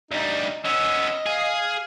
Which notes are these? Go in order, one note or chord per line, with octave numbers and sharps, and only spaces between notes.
D2 G3 D#4
B3 C#4 D#5 E6
G#4 F5